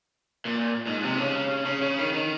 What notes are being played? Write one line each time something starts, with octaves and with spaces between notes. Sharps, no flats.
A#2
G#2
C3
C#3
C#3
C#3
D#3
D#3